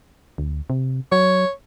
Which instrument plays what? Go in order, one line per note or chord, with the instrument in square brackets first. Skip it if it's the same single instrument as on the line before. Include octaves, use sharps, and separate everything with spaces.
[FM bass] D2
C3
[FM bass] F#3 [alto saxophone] C#5